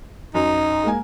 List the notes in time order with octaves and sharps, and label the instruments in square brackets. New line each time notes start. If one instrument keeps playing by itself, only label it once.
[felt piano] F#2 [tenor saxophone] D#4
[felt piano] G#3 A#3 G#5